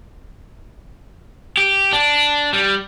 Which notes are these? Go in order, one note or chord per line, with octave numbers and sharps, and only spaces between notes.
G4
D4
G3